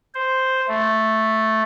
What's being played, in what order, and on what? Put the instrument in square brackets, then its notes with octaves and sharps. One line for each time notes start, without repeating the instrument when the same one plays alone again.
[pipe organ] C5
A3